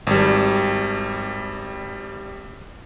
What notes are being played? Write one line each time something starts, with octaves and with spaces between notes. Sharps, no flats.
G#1 G3